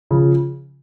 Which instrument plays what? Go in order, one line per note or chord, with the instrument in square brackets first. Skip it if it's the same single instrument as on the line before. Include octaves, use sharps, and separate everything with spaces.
[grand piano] C#3 F3